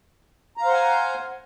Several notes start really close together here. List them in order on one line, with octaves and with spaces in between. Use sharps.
A#5 F5 C5 F#5 G#5